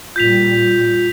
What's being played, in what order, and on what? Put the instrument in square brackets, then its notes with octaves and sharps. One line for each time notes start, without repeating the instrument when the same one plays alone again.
[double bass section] A#2 G3 [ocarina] F4 [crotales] G6 B6 F7